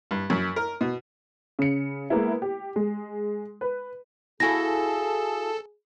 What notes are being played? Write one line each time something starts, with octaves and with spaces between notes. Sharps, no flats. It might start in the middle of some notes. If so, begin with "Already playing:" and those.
G2
F#2
A#4
B2
C#3 C#7
G#3 A#3 B3 E4
G4
G#3
B4
E4 F#4 G#4 A4 F5 G#5 A5 A#6